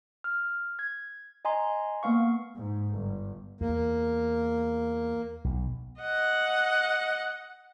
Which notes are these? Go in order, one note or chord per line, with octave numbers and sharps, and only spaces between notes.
F6
G#6
D#5 G#5 A#5 C6
A#3 B3 F5 C#6
G#2
G1
E2 A#3
B1
D#5 F#5